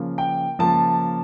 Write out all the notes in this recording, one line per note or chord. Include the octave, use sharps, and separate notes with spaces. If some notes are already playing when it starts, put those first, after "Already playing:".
Already playing: C#3 F3 A#3
G5
C#3 F3 A#3 A5